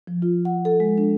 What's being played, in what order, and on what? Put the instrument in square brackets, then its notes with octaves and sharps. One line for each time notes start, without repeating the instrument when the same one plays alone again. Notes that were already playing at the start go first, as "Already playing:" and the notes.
[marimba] F3
F4
F#5
A4
G#3
D4